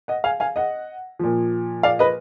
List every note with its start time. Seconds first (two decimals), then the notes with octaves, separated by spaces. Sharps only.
0.08 D#5 F#5
0.24 F5 G#5
0.40 F5 G#5
0.56 D#5 F#5
1.19 A#2 F3
1.83 D5 F5
1.99 B4 D#5